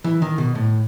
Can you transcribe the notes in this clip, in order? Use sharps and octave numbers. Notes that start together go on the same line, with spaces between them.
E3
D#3
B2
A2